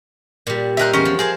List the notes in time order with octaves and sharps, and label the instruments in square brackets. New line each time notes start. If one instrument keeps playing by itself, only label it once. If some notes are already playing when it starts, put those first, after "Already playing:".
[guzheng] A#2 G3
[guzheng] D#4 A#4 C5 [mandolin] E5 F#6
[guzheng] E2 A#4 [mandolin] C#4
[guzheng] F3
[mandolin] G#4 [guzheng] A#4 C5 A5